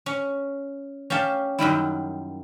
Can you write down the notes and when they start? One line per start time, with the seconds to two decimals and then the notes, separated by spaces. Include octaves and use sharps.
0.06 C#4
1.10 C#4 G4 F5 A5
1.59 F#2 D#3 G3 E4